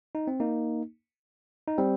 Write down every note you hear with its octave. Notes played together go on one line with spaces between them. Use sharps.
D#4
C4
A#3 D#4
D#4
G3 C4